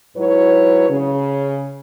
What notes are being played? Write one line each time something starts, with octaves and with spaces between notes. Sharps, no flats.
G#2 F#3 E4 F#4 B4 C#5
C#3